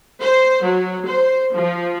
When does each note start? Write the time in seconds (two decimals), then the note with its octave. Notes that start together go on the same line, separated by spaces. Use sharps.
0.22 C5
0.64 F#3
1.07 C5
1.54 F3